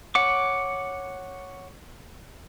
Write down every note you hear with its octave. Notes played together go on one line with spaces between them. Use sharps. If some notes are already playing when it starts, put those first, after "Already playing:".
C#5 F#5 D6